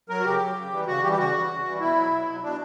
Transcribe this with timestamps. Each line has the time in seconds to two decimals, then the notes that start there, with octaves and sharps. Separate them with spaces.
0.09 F#3 A#4
0.20 F#4
0.25 C#3 G4
0.40 F#3
0.56 C#3
0.71 E3 G3
0.87 C#3 F#4
1.02 E3 G3 G4
1.13 G4
1.18 C#3 F#4
1.34 E3 G3
1.49 C#3
1.64 E3 G3
1.80 B2 E4
1.95 F#3
2.11 B2
2.27 F#3
2.42 B2 D4